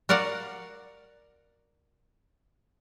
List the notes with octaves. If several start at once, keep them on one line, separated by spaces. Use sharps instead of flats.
F#4 A#4 D5 F5 F#5